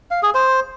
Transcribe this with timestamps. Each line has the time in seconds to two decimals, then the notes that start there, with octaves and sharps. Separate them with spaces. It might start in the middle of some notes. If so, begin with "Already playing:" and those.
0.11 F5
0.23 G#4
0.35 C5